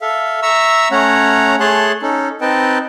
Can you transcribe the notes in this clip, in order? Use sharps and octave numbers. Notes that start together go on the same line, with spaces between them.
A4 E5 F5
E5 A#5 C#6 E6
A3 C#4 C#5 F#5 A#5
A3 G#4 C#5 A5 C6 F#6
C#4 D#4 A4
C4 D#4 B4 D#5 G5 A5